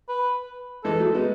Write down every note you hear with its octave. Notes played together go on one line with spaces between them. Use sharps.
B4
E3 G#3 A4
F#3 A3
G#3 B3